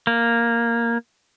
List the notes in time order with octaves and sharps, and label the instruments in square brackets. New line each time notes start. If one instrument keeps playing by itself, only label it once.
[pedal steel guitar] A#3